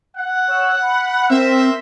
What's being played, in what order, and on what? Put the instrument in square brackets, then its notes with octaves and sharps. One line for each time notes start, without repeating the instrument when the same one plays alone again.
[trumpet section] F#5
[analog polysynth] C#5 E6
B5
[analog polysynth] C4 [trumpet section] A#4 C5 E5